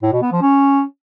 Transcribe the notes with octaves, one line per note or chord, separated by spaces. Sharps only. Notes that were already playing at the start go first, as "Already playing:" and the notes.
A2
B2
B3
F3
C#4